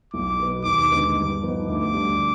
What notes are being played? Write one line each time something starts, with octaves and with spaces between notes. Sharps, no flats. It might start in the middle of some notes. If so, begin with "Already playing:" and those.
B1 D6
B2 B3
D#2 D6
D3 G#3 B3 D#4
G2
F3 B3 D#4
D2 D6
D3 G3 D4